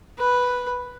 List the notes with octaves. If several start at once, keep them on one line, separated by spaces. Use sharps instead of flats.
B4